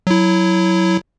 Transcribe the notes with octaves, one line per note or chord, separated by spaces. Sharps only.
F#3 E4